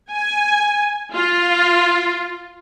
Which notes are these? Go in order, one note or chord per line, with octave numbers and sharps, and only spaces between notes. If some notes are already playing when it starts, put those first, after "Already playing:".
G#5
F4